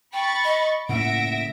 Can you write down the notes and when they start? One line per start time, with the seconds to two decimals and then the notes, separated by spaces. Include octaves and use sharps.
0.13 G5 B5 C#6 A6
0.44 D#5
0.89 A2 C#3 A#3 E5 F#5 A#6 D7